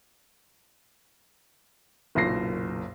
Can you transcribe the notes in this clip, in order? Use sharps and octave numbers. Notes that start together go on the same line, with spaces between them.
F#1 B1 F#2 A#2 A#6 C7